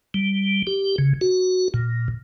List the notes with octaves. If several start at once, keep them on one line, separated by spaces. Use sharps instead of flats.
G3
G4
C#3
F#4
A#2